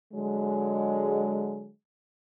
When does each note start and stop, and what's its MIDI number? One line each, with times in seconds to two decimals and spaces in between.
0.13 1.70 50
0.13 1.70 54
0.13 1.70 56